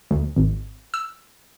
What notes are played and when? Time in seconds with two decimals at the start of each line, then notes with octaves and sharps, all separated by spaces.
0.11 D2
0.36 G#1
0.94 E6